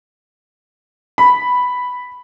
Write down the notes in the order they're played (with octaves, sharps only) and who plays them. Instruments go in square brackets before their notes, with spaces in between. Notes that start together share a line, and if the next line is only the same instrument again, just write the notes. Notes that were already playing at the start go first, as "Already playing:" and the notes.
[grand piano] B5